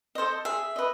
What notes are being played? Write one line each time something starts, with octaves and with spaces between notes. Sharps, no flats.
A4 C5 D#5
G#4 E5
B4 D#5